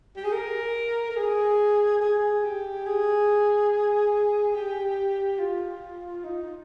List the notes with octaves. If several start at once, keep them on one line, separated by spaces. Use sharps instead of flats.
G4
G#4
A#4
A#4
G#4
G#4
G4
G#4
G4
F4
D#4